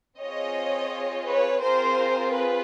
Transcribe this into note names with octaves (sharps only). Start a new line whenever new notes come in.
C4 F4 G#4 C#5 D#5
B4 C#5
C4 F4 G#4 A#4 C5
B4